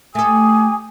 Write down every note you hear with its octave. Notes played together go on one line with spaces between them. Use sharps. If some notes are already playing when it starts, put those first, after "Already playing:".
A3 G4 A4 G#5 D#6